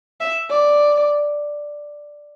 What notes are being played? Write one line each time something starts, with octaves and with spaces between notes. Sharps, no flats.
E5
D5